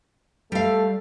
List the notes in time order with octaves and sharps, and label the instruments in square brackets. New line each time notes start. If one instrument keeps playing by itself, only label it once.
[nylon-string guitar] G3 F5 [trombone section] A3 A4